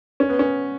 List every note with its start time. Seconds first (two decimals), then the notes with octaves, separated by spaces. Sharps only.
0.20 C#4
0.29 B3
0.39 C#4